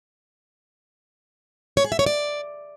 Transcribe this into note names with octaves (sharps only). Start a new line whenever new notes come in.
C#5
G#4
E5
C#5
D5